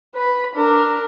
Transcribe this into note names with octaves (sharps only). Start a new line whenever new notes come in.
B4 B5
D4 A#4